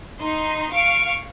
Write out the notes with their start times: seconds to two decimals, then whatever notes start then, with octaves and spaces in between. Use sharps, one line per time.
0.21 D#4 C6
0.72 F5 C#6 D7